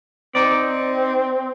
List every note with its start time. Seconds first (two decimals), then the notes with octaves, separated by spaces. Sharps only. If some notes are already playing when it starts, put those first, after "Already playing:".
0.35 C4 D#4 D5